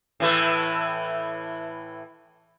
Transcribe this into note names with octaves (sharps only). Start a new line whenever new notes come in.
A2 E3 A4